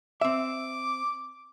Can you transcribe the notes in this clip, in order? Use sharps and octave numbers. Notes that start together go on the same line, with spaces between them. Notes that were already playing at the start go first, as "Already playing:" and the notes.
C4 E5 D6